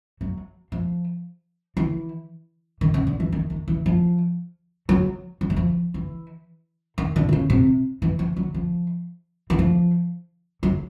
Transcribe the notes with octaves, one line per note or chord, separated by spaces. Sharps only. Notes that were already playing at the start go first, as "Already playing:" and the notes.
F#3
F3
E3
D#3
C#3
D3
E3
D#3
D#3
E3
F3
F#3
F3
F#3
F3
E3
D#3
D3
C3
C#3
C3
E3
F3
F#3
F3
E3
F3
F#3